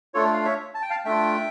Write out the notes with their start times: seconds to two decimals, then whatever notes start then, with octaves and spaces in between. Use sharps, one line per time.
0.14 A3 D4 F4 A4 C#5
0.34 F5
0.45 C#5 E5
0.74 A5
0.82 G5
0.90 F5 A5
1.05 A3 D4 F4 E5 G5